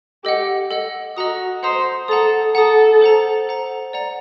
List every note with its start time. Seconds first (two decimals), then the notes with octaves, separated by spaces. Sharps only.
0.24 G4 A4 D#5 F#5
0.71 A4 D#5 F#5
1.16 F#4 A4 D#5 F#5 A#5 D#6
1.63 A4 C5 D#5 F#5 A#5 D#6
2.08 A4 F#5 A#5 D#6
2.55 A4 F#5 A#5 D#6
3.01 A4 C5 F#5 A#5
3.47 A4 C5 F#5 A#5
3.93 D5 F#5 A#5